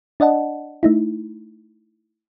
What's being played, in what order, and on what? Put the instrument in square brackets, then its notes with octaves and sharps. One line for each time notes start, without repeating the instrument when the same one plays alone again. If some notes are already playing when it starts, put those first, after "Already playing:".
[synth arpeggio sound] D4 D5 D#5 F#5 A5
A3 D#4 E4